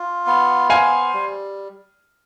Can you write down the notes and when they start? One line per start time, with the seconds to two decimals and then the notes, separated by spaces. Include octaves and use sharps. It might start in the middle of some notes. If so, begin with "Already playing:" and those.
Already playing: F4
0.27 B3
0.70 C5 F5 G#5
1.14 G3